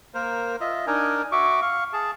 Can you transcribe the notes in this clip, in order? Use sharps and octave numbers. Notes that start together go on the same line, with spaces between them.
A#3 A#4 C5
F4 D#5 E5
D4 D#4 A#4 G#5
F#4 E5 C#6 D6
F5 C#6
G#4 A5